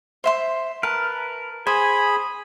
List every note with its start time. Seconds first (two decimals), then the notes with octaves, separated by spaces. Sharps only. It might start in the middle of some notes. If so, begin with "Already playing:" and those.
0.24 C5 E5 C6
0.83 A#4 B4 A5
1.67 G#4 C5 G#5 B5